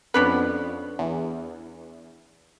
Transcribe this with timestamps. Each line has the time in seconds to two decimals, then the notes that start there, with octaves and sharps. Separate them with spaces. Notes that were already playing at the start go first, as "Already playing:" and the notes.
0.14 F2 B3 C#4 D4 B4
0.99 E2